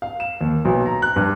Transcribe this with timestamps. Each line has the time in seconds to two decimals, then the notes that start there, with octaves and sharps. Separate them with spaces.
0.02 F5
0.20 E7
0.41 D#2
0.65 B1
0.86 A#5
1.02 F#6
1.16 G2